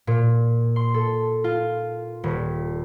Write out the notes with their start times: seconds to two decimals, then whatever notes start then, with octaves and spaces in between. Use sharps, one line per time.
0.07 A#2
0.76 C6
0.94 A4
1.44 F4
2.24 D#1